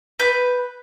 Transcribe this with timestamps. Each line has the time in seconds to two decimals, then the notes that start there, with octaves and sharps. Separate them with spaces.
0.19 B4 G6